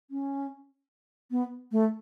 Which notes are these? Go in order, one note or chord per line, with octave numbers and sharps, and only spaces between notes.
C#4
B3
A3